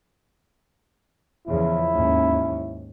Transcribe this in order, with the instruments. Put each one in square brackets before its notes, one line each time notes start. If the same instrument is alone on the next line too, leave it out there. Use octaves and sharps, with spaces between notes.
[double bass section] E2 C#3 F3 [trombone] E4
[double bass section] D#2 G#2 C#4